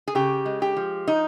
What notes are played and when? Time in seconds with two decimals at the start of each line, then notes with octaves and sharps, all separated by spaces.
0.08 G#4
0.15 C#3 G4
0.46 G#3
0.62 G4
0.77 F3
1.07 D#4